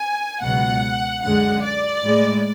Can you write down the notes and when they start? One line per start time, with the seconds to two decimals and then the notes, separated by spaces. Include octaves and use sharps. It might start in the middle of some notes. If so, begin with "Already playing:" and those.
Already playing: G#5
0.43 C#2 B2 F#3 F#5
1.23 F#2 D3 G#3 F#5
1.63 D5
2.05 A2 G#3